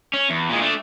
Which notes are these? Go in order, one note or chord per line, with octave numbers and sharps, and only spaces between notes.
C#4
E2
A#2 G#3
A3 D4